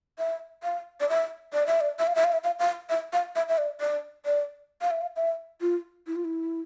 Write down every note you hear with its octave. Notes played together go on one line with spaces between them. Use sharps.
E5
F5
D5
E5
D5
E5
D5
E5
F5
E5
F5
E5
F5
F5
E5
F5
E5
E5
D5
D5
D5
F5
E5
F5
E5
F4
E4
F4
E4